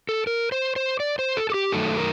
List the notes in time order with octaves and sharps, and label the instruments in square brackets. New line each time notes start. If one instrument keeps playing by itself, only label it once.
[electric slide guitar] A4
A#4
C5
C5
D5
C5
A4
A4
G4
F#2 D#3 F#3 A3 D#4 A4
A#4